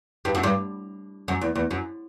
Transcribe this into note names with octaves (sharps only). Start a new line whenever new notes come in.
G2
F#2
G2
F#2
E2
E2
F#2